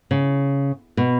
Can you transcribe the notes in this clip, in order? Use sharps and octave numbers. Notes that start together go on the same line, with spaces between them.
C#3
B2